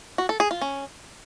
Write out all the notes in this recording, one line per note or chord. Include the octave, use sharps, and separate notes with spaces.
F#4
A4
G#4
F4
C#4